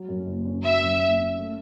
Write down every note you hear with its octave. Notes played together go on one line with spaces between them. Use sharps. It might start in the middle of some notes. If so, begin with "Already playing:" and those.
Already playing: F#3
F#2
F#1
C#4
F#3 E5
F#2
F#1
C#4
A3